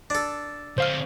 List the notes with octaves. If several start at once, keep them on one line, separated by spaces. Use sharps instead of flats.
D4 A4
D3 C4 C5 F5 F6